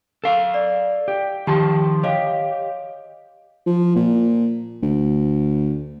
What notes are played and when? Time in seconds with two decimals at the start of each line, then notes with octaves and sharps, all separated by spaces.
0.24 A4 F5
0.54 D5
1.08 G4
1.47 D#3 F3 G4 A5 C6
2.03 G4 C#5 D#5 F5
3.66 F3
3.95 A#2
4.82 D2